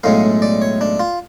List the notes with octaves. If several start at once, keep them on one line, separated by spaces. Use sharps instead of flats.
B1 A2 G#3 C#4 F5
D5
C#5
D4
F4